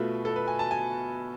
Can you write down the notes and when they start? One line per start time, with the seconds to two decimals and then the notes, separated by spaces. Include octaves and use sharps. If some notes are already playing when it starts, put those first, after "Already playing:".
Already playing: B2 A3 F4 B4
0.25 A4
0.36 B4
0.48 G#5
0.59 A5
0.71 G#5